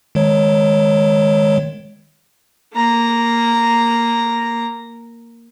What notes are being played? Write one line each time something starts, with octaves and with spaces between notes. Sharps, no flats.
D#3 G#3 C#5
A#3 A#5